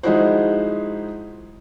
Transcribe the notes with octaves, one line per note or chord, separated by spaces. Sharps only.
F3 G#3 D#4 E4 F#4 C5